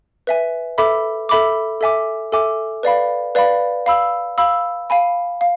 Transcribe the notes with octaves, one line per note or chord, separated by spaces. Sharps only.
B4 E5 G#5
A4 E5 B5 D6
A4 E5 B5 D6
A4 E5 G#5 D6
A4 E5 G#5 D6
B4 D5 F5 B5
B4 D5 F5 B5
F5 B5 E6
F5 B5 E6
F5 G#5 B5
F5